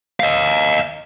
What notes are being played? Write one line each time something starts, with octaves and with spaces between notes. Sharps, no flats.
D#5 F5